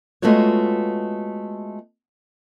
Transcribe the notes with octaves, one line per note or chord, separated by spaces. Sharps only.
G#3 A3 B3 F4 F#4 C#5